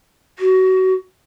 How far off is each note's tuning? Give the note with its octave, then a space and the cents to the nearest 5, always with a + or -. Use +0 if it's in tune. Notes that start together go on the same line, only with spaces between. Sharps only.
F#4 +25